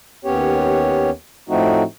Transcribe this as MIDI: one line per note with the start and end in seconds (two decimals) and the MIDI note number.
0.25 1.10 39
0.25 1.10 59
0.25 1.10 61
0.25 1.10 67
0.25 1.10 73
1.49 1.83 45
1.49 1.83 53
1.49 1.83 57
1.49 1.83 60
1.49 1.83 63
1.49 1.83 66